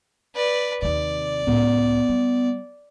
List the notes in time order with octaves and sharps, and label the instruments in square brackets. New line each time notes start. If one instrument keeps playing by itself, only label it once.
[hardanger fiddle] B4 D5
[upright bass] D#2 C3 [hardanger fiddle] D5
[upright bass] C#2 A2 [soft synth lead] B3
[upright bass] G3